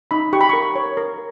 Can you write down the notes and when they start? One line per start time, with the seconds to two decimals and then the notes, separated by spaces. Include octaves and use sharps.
0.11 D#4 B5
0.33 G4 C#6
0.41 B5
0.49 A#4 C#6
0.75 C#5
0.97 A#4